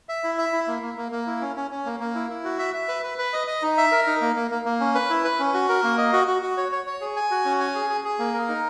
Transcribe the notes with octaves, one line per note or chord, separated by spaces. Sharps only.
E5
E4
E5
E4
A#3
A#3
A#3
A#3
E4
C#4
C#4
C#4
A#3
A#3
E4
E4
F#4
E5
E5
B4
B4
B4
D#5
D#5
D#4
E5
A#4
D#4
A#3
A#3
A#3
A#3
C#4
B4
E4
B4
C#4
F#4
A#4
A#3
D#5
F#4
F#4
F#4
C#5
C#5
C#5
G#4
G#5
F#4
C#4
G#5
G#4
G#4
G#4
A#3
A#4
D#4